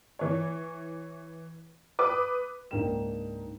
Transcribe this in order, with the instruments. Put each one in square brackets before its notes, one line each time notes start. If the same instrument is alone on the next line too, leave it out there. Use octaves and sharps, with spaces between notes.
[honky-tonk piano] E3 C#5
B4 D6 D#6
[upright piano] C#2 G#2 A#3 D4 G5 E7